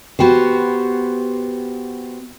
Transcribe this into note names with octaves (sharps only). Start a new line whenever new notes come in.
B3 F#4 G4 C5